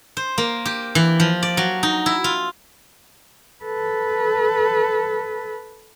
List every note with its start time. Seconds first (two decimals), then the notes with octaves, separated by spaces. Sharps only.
0.17 C5
0.38 A#3
0.66 G4
0.95 E3
1.20 F3
1.43 D5
1.57 F#3
1.83 D#4
2.06 E4
2.24 F4
3.64 A4 B4